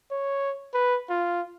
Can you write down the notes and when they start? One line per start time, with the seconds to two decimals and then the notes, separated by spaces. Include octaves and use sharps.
0.11 C#5
0.74 B4
1.09 F4